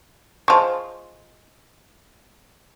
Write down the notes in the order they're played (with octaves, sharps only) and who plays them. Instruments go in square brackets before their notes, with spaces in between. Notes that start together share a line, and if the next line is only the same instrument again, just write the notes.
[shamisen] G#3 F4 [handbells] C5 A5 C#6